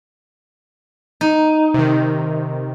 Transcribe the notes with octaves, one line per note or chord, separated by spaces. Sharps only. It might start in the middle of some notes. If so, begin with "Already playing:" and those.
D#4
C3 D#3